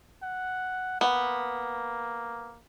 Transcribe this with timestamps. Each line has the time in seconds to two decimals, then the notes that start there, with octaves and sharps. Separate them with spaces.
0.22 F#5
1.01 A#3 B3